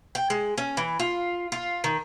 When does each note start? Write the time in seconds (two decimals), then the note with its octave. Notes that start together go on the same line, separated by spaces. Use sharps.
0.15 G5
0.30 G#3
0.58 C#4
0.77 E3
0.99 F4
1.52 F4
1.84 D#3